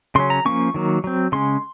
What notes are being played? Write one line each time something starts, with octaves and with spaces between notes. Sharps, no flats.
C#3 F#3 C#4 C6
A#5
F3 A#3 C#4 C#6
D#3 F#3 A#3
F#3 C4
C#3 G#3 C#4 C6